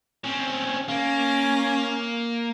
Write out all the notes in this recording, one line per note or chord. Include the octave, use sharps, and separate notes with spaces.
C4 C#4
A#3 C#4